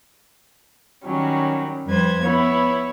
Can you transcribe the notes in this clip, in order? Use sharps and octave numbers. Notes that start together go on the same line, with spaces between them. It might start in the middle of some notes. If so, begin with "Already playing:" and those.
D#3 F#3 G3 C#4
F2 G3 B4 C5 G#6
B3 E4 C#5